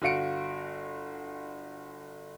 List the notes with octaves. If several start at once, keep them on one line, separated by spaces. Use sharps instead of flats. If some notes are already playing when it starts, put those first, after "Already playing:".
G1 F#4 F5 C#7 D7